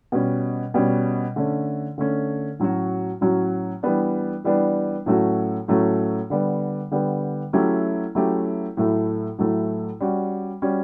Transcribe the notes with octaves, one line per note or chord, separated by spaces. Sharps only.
B2 G3 C#4
B2 G3 C#4
D3 A3 C#4
D3 A3 C#4
A2 F#3 C#4 F#4
A2 F#3 C#4 F#4
E3 G3 B3 D4
E3 G3 B3 D4
A2 F#3 A3 C#4 F#4
A2 F#3 A3 C#4 F#4
D3 G3 B3
D3 G3 B3
F#3 A3 C#4 E4 G4
F#3 A3 C#4 E4 G4
A2 F#3 A3 E4
A2 F#3 A3 E4
G3 C#4 F#4
G3 C#4 F#4